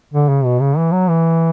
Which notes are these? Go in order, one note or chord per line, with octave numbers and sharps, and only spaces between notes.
D3
C#3
B2
C#3
E3
F#3
E3